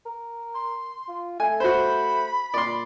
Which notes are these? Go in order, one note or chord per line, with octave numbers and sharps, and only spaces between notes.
A#4
C6
F4
A3 G#5
F#4 C5 B5
A#2 D5 C6